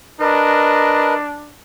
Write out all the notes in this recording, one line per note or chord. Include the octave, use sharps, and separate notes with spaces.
D4 A#4 B4 D#5